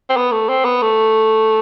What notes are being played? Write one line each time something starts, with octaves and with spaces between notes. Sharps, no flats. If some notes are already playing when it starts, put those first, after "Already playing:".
C4
B3
A3
C4
B3
A3